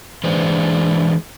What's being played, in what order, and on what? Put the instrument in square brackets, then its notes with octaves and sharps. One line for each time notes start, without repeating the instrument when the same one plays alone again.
[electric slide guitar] E3 G#3 D4 C5